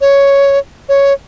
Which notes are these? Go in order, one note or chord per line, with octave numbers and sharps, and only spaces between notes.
C#5
C#5